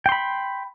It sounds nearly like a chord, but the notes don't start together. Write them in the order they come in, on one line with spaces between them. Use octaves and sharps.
G5 C6 B5